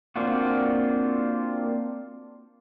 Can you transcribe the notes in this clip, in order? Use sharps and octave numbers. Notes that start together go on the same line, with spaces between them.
A#3 C4 D4 F4 F#4